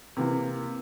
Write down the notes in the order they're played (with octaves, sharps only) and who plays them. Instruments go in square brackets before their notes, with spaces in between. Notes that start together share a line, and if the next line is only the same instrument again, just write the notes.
[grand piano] C3 E3 A#3